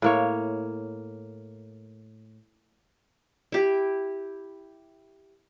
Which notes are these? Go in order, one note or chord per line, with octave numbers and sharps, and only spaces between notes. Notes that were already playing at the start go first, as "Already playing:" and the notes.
A2 A#3 C#5
E4 G4